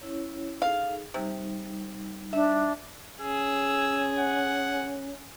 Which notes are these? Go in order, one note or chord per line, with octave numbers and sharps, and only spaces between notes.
C#4 E4 C#5
D#4 G#4 A4 F5
C3 G3 D#4
D4 E5
C#4 G#4 E6
F#5